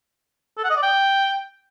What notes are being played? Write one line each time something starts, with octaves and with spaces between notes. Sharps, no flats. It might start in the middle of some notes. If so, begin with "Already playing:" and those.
A4
F#5
D#5
D5
G5